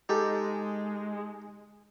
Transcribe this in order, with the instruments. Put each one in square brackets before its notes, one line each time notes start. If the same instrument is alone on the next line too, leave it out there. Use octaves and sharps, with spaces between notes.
[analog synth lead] G#3 [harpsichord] D#4 G4 A4